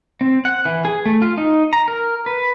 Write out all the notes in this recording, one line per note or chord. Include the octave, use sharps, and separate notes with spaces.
C4
F#5
E3
G#4
A3
F4
D#4
A#5
A#4
B4